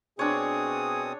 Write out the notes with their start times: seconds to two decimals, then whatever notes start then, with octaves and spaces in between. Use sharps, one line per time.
0.19 B2 C4 D4 G#4 C#5 D#6